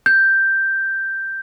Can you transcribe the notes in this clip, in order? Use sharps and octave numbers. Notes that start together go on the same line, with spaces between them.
G6